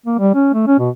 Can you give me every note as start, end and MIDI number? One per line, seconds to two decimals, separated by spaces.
0.06 0.18 58
0.19 0.31 55
0.35 0.50 61
0.54 0.66 57
0.67 0.78 61
0.79 0.90 47